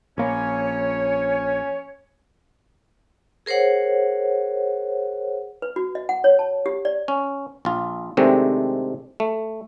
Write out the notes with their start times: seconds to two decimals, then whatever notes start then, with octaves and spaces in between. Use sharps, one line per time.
0.18 A#1 A#3 C#4 C#5
3.46 G#4 A#4 C5 C#5 F#5
5.62 B4
5.76 F#4
5.95 D#5
6.09 F#5
6.24 C#5
6.39 A5
6.66 G4
6.85 D5
7.08 C#4
7.65 A#1 F4
8.17 C3 D#3 G#3 A3 C4 D4
9.20 A3